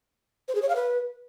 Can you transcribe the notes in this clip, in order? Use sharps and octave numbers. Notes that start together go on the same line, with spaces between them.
C5
G#4
C#5
F5
B4